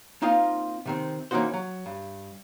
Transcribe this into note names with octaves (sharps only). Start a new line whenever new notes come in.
A#3 C4 D#4 F4 D#5 F5
C3 D#3 C4
E3 A#3 C#4 D#4 F#4 C5
F#3
G2